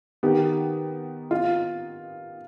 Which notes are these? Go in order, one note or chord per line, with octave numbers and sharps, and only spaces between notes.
D#3 B3 D#4 G4
F4